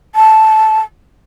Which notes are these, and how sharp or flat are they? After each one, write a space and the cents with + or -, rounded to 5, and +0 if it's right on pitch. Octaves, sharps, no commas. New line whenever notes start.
A5 -10